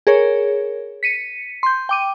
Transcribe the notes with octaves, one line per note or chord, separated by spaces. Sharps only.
G#4 A#4 C#5
B6 C#7 D#7
C6 G6
G5 D6 D#7